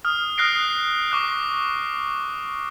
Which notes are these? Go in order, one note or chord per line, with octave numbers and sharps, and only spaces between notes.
D#6 F6
D#6 F6 F#6 A#6 C7 D7
C#6 D6 F#6